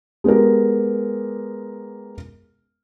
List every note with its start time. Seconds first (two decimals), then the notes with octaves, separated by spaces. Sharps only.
0.24 G#3 B3 G4 A#4